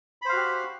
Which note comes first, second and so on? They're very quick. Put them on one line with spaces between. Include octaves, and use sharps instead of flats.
B5 C5 F5 F#4 G4